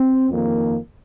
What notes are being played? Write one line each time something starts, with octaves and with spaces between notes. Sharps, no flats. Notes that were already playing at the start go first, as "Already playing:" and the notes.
Already playing: C4
F2 D#3 A#3